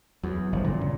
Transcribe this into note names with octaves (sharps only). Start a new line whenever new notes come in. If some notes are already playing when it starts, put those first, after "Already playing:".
E2 F#3
G1 F3
A#2 D3
C#3